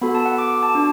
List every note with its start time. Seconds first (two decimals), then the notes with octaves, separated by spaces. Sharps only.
0.01 B3 F#4 A4 B5
0.15 A5
0.25 F#5
0.38 D6
0.50 D6
0.63 A5
0.75 D4 F#4